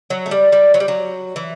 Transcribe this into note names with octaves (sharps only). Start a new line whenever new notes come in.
F#3
A3
G3
G3
F#3
G3
F#3
E3